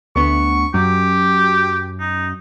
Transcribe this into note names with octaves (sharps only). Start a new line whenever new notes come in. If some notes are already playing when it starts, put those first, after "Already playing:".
D2 B3 C#6
F#2 G4
D#4